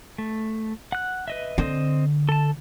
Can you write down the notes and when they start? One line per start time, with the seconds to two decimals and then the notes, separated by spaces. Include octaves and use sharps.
0.18 A3
0.92 F#5 F#6
1.28 B4 D#5 E5
1.58 D3 C4 C5 D#5
2.29 A4 A5